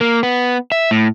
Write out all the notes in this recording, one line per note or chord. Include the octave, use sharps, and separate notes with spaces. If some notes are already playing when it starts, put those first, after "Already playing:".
A#3
B3
E5
A2